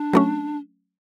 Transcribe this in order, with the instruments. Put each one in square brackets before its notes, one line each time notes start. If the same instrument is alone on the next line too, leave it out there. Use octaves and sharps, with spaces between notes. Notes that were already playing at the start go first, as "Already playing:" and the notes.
Already playing: [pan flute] D4
[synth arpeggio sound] F#3 A3 C#4